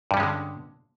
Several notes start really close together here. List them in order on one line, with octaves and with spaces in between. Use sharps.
G2 G3 C#4 G#3 D3